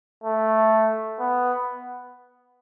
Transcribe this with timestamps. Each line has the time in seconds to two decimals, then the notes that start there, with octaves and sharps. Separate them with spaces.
0.24 A3
1.19 B3